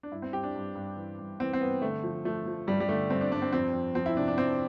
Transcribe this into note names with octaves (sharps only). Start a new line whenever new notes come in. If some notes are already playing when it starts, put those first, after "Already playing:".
D4
G2 E4
C4
G2 G4
D4
G2
G2
E3
G2
E3 C4
C4
G2 B3
D3 A3
F3
F3 A3
F3
G2 G3
G3
D3 A3
G2 C4
D4
G2 D4
C4
F2 C4
F2
F3 C4
E4
C3 D4
D4
F2 C4